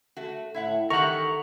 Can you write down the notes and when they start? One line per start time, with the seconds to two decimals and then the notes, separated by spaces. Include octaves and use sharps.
0.17 A3 F#4
0.54 A2 E4 E5 F#5
0.90 D#3 E3 G4 A4 A#4 E5 F#5 C#6